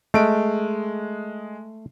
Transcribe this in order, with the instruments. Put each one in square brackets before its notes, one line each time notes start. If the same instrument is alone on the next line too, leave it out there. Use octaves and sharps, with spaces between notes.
[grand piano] G#3 D7 [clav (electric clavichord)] A3